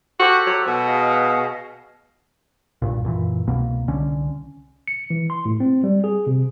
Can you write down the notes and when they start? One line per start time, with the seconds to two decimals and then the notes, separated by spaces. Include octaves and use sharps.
0.20 F#4 G4 A4 C5
0.47 F#3
0.67 B2 A4
0.88 G#4 D#5 F5
2.82 B1 G2 A#2
3.04 F#2 A#2 E3
3.47 C2 B2 A#3
3.88 C2 D3 C#4
4.87 C#7
5.10 E3
5.30 C6
5.45 A2
5.60 C4
5.84 G3
6.04 G#4
6.27 C3